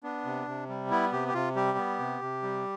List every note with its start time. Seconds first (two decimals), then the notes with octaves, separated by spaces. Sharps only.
0.03 B3 D4
0.25 C3
0.47 C3
0.69 G3
0.90 B3 E4
1.12 C3 G4
1.28 G4
1.34 C3 F4
1.56 G3 G4
1.78 B3
1.99 C3
2.22 C3
2.43 G3